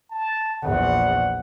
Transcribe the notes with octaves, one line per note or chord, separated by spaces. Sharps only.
A5
A#1 E2 F#5